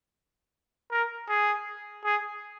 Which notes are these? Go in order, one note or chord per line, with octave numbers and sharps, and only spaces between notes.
A#4
G#4
G#4